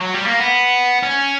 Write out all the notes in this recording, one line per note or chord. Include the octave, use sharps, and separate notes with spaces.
F#3
G3
A#3
B3
C#4